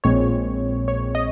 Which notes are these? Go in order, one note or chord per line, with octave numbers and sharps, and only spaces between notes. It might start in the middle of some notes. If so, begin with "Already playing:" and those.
A#1 A#2 G#3 C4 C#5
C#5
D#5